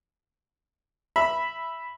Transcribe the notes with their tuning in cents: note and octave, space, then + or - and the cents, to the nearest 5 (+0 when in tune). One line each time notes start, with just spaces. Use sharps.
E5 +0 B5 +0 E6 +0